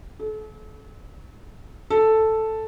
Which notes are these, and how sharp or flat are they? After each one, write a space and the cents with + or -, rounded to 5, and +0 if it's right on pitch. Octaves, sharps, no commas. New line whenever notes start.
A4 -40
A4 +0